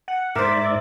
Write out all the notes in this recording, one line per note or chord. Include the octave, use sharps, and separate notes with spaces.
F#5
G#2 A#4 C5 D5 E5 D6